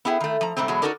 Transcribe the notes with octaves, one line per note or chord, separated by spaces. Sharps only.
B3 E4 G#4 G5
D#3 A3
F3 A#5
G#2 C3 G3 A3 C4
E2 B2 F#3 G#3
D#4 F4 F#4 A4 A#4 D5